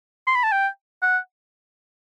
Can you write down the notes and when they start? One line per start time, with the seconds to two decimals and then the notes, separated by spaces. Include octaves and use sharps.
0.27 C6
0.36 B5
0.43 A5
0.52 G5
1.02 F#5